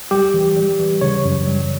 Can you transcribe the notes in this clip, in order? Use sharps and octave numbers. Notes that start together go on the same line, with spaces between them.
G3 G4
E3
G3
E3
C#3 C#5
F#2
G3